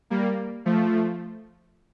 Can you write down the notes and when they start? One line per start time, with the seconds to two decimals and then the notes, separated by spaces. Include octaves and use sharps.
0.10 G3 A#3
0.65 F3 A3